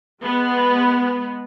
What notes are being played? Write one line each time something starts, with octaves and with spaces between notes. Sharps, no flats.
G#3 B3